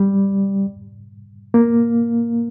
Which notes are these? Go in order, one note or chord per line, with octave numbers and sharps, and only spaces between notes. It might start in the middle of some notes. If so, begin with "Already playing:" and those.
Already playing: G3
A#3